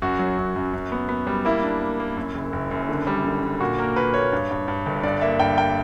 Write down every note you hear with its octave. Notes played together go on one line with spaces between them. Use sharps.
F#2 F#4
F#3
F#2
F#2
F#2
B3
B3
G3
A#3 E4
D4
A#3
A#3
F#2
F#1
F#1
F#2
D3
G3
D3
D3
A#2 F#4
A#3 A#4
A#2 B4
A#3 C#5
G2
G2
G2
G1
G2 D5
A#3 E5
G2 G5
A#3 G5